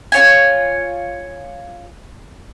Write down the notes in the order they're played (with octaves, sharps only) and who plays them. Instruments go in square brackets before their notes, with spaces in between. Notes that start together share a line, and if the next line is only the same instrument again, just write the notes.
[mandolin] F4 C#5 G#5